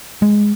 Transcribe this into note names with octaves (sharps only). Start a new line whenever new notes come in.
G#3